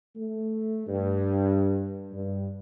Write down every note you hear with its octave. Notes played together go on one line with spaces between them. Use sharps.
A3
G2
G2